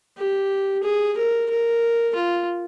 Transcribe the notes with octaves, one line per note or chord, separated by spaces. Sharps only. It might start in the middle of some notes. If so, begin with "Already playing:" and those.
G4
G#4
A#4
A#4
F4